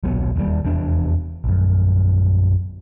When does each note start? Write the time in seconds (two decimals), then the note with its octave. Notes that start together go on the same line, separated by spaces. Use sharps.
0.03 D#1 B1 F#3 B3
0.36 E1 D#2 B2 G3
0.63 F1 E2 D4
1.44 A#1 F#2